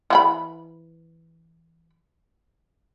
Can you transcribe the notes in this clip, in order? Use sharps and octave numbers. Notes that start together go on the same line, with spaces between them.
E3 F#4 B5